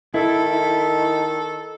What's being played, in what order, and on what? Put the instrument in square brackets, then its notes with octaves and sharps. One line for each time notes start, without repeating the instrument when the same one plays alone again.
[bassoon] D#3 [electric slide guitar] E4 [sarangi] A4